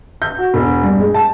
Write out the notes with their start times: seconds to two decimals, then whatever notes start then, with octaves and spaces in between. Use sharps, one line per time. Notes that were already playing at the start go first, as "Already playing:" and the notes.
0.22 G6
0.38 F#4
0.54 E1
0.83 G2
1.00 G#3
1.14 A5